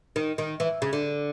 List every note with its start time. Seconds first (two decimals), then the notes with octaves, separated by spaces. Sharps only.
0.16 D#3
0.38 D#3
0.60 E3
0.82 C#3
0.93 D3